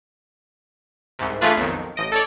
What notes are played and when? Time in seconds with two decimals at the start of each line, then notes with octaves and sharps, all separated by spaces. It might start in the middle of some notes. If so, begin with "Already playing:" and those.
1.19 C2 G#2 C3
1.41 E3 A3 D4 F4 G#4 B4
1.57 B1 F2 D#3
1.96 A1 D#5 D7
2.12 A4 C#5 D5